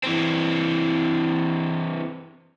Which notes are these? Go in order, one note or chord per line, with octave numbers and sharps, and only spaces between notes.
E3 C4